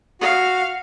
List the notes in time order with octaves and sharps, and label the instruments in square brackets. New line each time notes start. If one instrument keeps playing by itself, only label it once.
[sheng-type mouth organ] F#4 [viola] F5